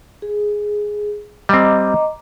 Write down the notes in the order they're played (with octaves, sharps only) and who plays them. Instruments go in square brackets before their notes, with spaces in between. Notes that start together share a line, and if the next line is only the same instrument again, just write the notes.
[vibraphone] G#4
[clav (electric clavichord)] G3 C4 [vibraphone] D#5 A#5 D6